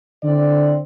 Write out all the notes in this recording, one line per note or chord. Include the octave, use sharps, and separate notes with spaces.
D3 C4 E4 D5